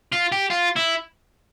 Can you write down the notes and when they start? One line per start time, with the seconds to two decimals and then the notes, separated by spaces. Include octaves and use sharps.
0.12 F4
0.32 G4
0.50 F4
0.76 E4